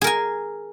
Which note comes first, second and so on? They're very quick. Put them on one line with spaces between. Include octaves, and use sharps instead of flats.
G#4 A#4 G#5